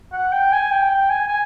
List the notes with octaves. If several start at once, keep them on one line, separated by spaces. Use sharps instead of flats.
F#5
G5
G#5
G5
G5
G#5
G#5